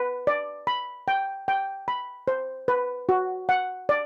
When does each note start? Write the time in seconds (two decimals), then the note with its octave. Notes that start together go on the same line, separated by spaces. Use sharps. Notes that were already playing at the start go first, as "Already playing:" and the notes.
Already playing: B4
0.27 D5
0.67 B5
1.08 G5
1.48 G5
1.88 B5
2.28 C5
2.68 B4
3.09 F#4
3.49 F#5
3.89 D5